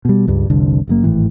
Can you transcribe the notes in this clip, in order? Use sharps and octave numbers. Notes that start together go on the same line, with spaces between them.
B2 G3
C#2 G2 G3
F1 C2 D3
F#1 F#2 A#3
G#1 A2 E3